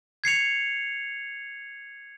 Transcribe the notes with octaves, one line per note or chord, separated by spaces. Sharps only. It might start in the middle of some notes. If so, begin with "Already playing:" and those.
G#6 C7 C#7 F7